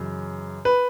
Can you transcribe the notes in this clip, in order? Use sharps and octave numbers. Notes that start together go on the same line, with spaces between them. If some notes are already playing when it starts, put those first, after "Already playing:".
Already playing: F#2 C#3 E3 G#3
B4